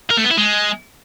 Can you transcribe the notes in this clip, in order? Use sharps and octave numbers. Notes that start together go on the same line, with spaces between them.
A#4
A3
B3
E4
G#3